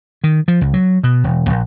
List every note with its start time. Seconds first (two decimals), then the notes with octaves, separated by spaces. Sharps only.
0.24 D#3
0.48 F3
0.61 C#2
0.74 F#3
1.03 B2
1.24 E1
1.50 A#1